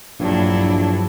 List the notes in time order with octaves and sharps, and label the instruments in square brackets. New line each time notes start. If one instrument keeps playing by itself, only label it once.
[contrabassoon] A#1 [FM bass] G2 [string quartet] F#3 D4 E4